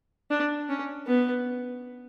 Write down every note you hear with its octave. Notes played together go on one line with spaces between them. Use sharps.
D4
C#4
B3